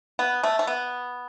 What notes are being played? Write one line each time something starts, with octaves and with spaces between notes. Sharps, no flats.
B3
A3
A3
B3